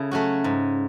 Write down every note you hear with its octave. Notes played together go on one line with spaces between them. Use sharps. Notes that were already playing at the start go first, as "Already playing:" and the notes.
Already playing: C#3 E4 A4
F#3 A3 C#4 F#4
G#2